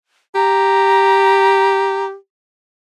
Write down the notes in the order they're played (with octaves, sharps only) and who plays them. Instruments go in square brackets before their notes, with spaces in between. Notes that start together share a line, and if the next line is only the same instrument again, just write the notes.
[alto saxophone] G4 [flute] A#5